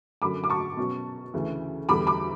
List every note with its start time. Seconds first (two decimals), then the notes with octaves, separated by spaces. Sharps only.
0.22 F#2 D3 F#3 C#4 B5 D6
0.44 D6
0.50 A5 C#6
0.77 B2 F#3 C#4
1.34 D2 C#3 E3
1.89 E2 D3 G3 B5 D6
2.07 B5 D6